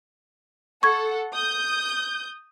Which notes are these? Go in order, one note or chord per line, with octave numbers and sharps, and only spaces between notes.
A4 F#5 C#6 G#6
D#6 G6